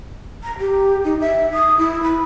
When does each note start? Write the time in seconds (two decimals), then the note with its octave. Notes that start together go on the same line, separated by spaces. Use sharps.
0.43 A#5
0.59 G4
1.04 D#4
1.20 E5
1.54 D#6
1.78 E4
2.03 B5